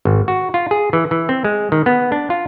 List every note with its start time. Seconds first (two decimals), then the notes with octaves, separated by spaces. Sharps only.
0.05 G#1
0.28 F#4
0.54 F4
0.71 G#4
0.93 E3
1.11 E3
1.29 C4
1.44 G#3
1.72 D#3
1.86 B3
2.12 D4
2.30 F4